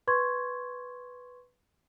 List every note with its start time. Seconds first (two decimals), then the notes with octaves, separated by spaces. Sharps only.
0.07 B4 C6 C#6 G#6